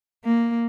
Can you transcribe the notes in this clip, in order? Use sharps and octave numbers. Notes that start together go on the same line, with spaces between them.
A#3